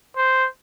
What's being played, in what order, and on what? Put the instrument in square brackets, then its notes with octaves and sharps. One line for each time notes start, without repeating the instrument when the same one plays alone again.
[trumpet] C5